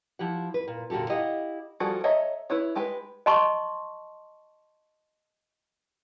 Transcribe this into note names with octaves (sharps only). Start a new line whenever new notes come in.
F3 E4 G4 F#5
B4
A#2
A#2 D3 F#4 G4 A4
E4 G4 D#5 F5 F#5
F3 G3 F#4 G#4 A4
A4 C#5 D#5 E5 A#5
E4 B4 C#5
G#3 G4 B4
D#5 A5 C6 C#6